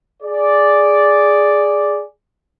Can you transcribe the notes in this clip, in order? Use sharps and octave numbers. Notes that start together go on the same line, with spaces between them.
G#4 D5